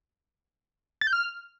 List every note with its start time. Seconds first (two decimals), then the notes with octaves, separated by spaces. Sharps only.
1.01 A6
1.07 G6
1.13 F6